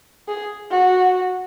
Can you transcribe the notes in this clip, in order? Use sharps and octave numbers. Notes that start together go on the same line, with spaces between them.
G#4
F#4